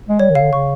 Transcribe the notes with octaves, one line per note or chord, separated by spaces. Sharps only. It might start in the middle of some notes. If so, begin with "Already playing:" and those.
G#3
G3 C#5
D#3
C#3 F5
D3
C#3 C#6